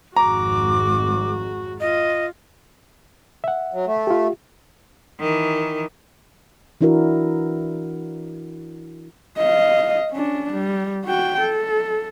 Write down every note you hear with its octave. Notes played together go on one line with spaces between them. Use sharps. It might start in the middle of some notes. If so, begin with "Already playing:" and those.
G#1 F2 G#3 F#4 A#5 D6
F4 D#5
E5 F#5
F#3
A3
F4 G4
D#3 E3
E3 D4 E4 F#4 A#4
D#5 F5
C#4 D4
G3
F#4 G5
A4